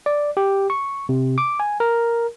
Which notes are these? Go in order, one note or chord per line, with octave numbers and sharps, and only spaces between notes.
D5
G4
C#6
C3
D6
G#5
A#4